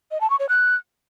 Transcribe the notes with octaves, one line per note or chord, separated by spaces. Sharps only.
D#5
A5
C#6
C#5
F#6